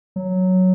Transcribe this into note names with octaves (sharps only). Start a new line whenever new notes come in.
F#3